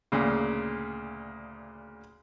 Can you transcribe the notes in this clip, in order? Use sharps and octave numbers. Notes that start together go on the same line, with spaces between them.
D2 A#2 C#3